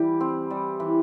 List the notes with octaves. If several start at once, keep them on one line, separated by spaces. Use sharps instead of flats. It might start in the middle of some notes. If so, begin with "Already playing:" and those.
Already playing: E3 G3 G4
C4
G3
E3